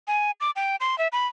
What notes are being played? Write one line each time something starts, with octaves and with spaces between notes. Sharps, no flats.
G#5
D6
G5
C6
E5
B5